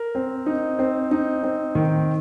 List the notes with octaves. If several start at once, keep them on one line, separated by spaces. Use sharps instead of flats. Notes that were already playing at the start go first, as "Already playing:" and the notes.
Already playing: A#4
C4
D#4
C4
D#4
C4
D#3